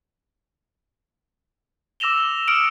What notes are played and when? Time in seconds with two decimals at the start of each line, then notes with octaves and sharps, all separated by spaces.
2.00 D6 E6 A#6 E7 F7 G7
2.47 D#6 F6 C#7 D7 E7 F#7